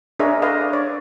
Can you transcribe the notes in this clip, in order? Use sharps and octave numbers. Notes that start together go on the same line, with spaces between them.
D4 G#4 A#4 C#5 D#5 E5
A4 B4 D#5 F5
D5
D4 C#5 D5